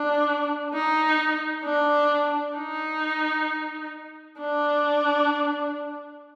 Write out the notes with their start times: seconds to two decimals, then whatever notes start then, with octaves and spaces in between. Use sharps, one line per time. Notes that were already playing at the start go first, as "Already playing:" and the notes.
Already playing: D4
0.74 D#4
1.65 D4
2.57 D#4
4.40 D4